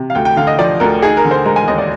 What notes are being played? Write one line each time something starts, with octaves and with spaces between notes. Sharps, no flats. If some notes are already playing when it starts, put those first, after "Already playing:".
Already playing: C3
F5
D2 G5
G5
D3 F5
D#5
F3 D5
D2 A#4
D#4 G#4
A#4
D3
C5
G#3 A#4
G#5
D#2 D#5
D5